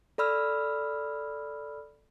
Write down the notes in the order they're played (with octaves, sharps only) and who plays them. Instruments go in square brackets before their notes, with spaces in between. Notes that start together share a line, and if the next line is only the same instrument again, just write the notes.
[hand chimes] A4 D5 B5 E6 F6